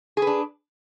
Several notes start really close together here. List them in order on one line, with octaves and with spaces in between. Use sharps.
G#4 B4 D4